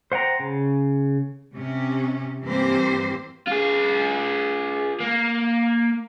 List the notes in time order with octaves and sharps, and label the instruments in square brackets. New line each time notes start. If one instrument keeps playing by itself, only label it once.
[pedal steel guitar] C5 F#5 G5 A#5
C#3
[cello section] C3 C#4
G2 E3 A#3 C4 G4 C5
[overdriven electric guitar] F4 G#4
A#3